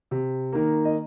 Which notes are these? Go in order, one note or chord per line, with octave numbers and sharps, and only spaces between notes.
C3
D#3 A#3
D#5